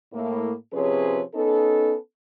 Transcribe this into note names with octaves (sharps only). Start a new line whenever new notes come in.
A2 A#3
C3 F3 C#4 G#4 B4 C#5
B3 C#4 D#4 A4